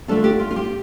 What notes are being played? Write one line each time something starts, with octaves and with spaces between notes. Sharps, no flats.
D3 A3 D4 F4 A4
G4
F4
F4
G4